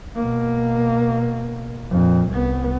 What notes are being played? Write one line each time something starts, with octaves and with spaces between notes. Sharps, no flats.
B2 A#3
F2 A#2
C2 B3